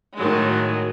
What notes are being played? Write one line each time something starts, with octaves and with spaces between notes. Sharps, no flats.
A2 D#3 F#3 G#3